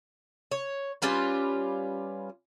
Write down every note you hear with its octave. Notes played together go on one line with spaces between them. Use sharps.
C#5
G3 C#4 F4 B4